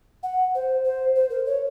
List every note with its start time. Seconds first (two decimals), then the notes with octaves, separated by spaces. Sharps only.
0.23 F#5
0.55 C5
0.84 C5
1.16 C5
1.30 A#4
1.46 C#5